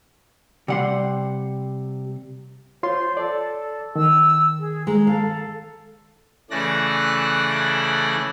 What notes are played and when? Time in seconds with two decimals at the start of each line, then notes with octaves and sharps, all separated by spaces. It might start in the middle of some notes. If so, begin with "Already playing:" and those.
0.68 C3 G3 F#5 C6
2.83 F4 C5 C#5 C6
3.17 A4 D5
3.96 D#3 E6
4.60 G#4
4.87 G#3 A#5
5.07 A4 F5
6.51 C#3 E3 A3 D5 F#6 A#6